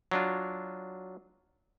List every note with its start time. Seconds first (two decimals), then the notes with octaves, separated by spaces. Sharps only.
0.11 F#3 D4 F4